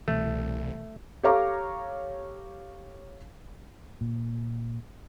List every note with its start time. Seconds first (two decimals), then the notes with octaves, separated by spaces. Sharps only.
0.08 C2 B2 E3 A3
1.23 G4 A4 C#5 F5 A#5 D6
4.01 A#2